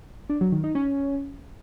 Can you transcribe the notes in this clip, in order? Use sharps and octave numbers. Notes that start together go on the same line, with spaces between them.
D4
F#3
D#3
D#4
C#4